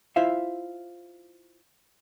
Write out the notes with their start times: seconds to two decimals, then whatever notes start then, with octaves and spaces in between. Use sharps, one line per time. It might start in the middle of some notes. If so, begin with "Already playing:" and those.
0.16 E4 F4 C5 E5 F5